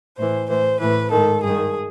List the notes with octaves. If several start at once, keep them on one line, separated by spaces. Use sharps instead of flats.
A2 E3 C5
A2 E3 C5
A2 E3 B4
G#2 D#3 A4
G2 D#3 G#4